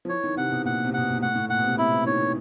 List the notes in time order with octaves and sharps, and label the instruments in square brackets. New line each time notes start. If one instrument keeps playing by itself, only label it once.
[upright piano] F3
[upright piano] E3 [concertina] C#5
[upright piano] D#3
[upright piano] C3 [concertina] F#5
[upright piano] B2
[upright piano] A#2 [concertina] F#5
[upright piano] C3
[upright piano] B2 [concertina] F#5
[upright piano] A#2
[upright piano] A2 [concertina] F#5
[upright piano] A2
[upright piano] A#2 [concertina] F#5
[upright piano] B2
C3
[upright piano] C3 [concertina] E4
[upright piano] E3
[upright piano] D#3 [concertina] C#5
[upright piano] E3